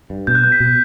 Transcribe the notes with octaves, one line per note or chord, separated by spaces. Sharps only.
G2
B2 G6
F#6
B3 G6
B6
B2